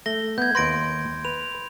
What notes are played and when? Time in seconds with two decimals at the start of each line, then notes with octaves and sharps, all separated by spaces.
0.06 A3 A#6 G7
0.38 B3 G6 G#6
0.55 D#2 B4 C6 A#6 D7
1.25 B4 F7